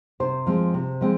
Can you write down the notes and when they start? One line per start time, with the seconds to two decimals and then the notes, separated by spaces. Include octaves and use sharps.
0.20 C3 C5
0.46 F3 G#3 C4
0.74 C3
1.01 F3 G#3 C4